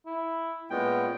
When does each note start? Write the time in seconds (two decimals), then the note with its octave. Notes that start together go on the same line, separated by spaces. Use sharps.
0.06 E4
0.71 A#2 G#3 B3 C#4 G5